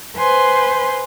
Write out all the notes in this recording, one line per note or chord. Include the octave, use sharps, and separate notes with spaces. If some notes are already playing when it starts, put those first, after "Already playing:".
B4 C5 G#5 C6